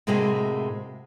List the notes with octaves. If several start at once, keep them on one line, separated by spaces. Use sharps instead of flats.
A2 C3 G#3 A#3 C4 F#4